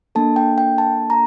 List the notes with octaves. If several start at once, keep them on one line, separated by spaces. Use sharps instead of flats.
A#3 D4 A4 A5
G5
G5
A5
A#5